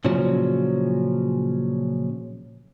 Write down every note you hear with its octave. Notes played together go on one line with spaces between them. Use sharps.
A#2 C#3 F3 F#3 C#4